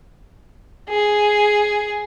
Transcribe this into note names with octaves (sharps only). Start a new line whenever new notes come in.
G#4